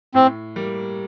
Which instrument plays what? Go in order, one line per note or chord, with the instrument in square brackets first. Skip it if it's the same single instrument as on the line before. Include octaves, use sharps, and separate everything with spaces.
[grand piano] A2 [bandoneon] C4
[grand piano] G3 A#3